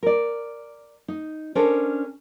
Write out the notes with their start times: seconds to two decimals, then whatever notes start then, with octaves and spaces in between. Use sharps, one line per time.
0.03 A#4 D5
1.08 D#4
1.55 C#4 D4 A4 A#4 C5